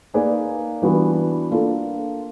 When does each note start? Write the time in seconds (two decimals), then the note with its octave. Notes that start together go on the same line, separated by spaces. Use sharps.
0.14 A#3 D#4 G#4 B4 D5
0.82 E3 G3 B3 D4 F#4
1.51 A#3 D4 F4 A4